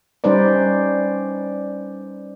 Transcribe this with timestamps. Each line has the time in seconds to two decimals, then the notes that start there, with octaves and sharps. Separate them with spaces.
0.24 G3 C#4 D#4 B4 C5 D5